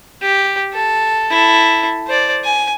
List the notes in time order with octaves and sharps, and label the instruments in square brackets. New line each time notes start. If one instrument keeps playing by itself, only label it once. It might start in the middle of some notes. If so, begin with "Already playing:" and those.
[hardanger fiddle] G4
A4
E4 A4
C5 D5
G#5